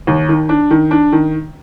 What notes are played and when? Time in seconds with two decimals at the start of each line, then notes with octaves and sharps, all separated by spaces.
0.07 D#2
0.29 D#3
0.49 D4
0.71 D#3
0.91 D4
1.12 D#3